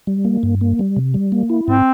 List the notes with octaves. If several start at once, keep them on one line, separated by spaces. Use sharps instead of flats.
G3
A#3
G2
A#3
G3
C3
G3
A#3
E4
G#2 C4